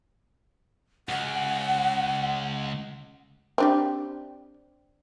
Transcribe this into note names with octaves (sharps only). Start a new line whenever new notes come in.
C#2 F#5
C4 D4 G4